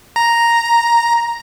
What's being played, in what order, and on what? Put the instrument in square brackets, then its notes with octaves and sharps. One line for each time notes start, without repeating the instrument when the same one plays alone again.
[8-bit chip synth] A#5